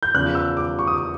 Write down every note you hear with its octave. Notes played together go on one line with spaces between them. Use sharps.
G6
E2 C#3 F3 F#6
E6
D6
C#6
D#6
D6